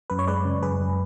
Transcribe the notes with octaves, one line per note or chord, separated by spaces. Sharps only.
F#2 B4
C#5
G#3 B4 D5
C#3
F#2 G#4 B4
F#2